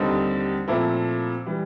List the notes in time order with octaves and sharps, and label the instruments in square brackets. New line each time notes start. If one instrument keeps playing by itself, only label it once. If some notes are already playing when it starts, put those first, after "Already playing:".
Already playing: [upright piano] D#2 D3 G3 C4 D#4
A#2 F3 A3 C4 E4
E3 G3